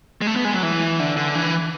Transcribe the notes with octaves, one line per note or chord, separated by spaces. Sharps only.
G#3
A3
B3
G#3
F#3
E3
D3
D3
E3